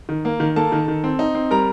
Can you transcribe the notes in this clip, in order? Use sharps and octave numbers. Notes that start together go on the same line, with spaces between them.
D#3
A#3
D#3
A#3 A4 A5
D#3
D#3
C4
D#4
C4
G3 A#4 A#5